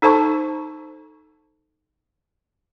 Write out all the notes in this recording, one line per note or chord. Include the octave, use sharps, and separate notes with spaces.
D#4 A4 C5 A5 C#6